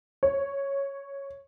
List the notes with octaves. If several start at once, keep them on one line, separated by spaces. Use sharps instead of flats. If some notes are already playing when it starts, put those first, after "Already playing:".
C#5